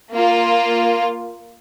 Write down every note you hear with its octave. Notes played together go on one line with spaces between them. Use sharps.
A#3 F4